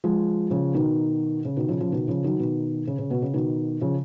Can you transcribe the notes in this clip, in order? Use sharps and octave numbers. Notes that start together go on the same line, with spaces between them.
F3 G#3
C#3 F3
B2 D#3
C#3
B2 D#3
C#3 F3
C#3 F3
B2 D#3
C#3 F3
D#3 F#3
B2 D#3
C#3
C#3
B2
C#3
B2 D#3
C#3 F3